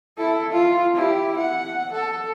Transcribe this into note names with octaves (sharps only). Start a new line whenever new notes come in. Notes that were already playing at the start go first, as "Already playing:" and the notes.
E4 A4
F4
E4 G4
F#5
A4